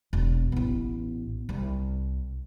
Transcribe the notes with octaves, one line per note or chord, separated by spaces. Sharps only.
E1
A1 B3
C2